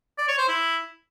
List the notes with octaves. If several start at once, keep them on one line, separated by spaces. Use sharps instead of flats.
D5
C#5
C5
E4